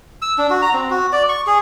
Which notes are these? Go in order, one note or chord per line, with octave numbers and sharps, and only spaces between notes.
E6
D4
F#4
A#5
C4
F#4
D5
C#6
G#4